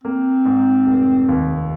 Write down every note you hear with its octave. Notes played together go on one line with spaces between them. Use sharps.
A#3 C4
G#2
F1
D#2